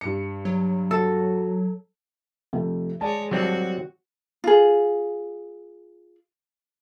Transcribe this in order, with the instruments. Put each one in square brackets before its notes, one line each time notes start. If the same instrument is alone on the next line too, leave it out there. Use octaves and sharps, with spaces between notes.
[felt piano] G2 C#7
[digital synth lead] F#3
[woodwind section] F#4 [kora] A4
[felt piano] F2 C3 A3
[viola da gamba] G#3 C#5 [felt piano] D5 A5
[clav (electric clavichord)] F#3 G3 C4 [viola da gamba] F#4
[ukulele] F4 G#4